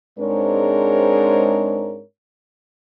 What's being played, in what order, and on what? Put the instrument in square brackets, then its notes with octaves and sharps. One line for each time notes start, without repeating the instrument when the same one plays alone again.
[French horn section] G#2 G#3 C4 D4 A#4 C#5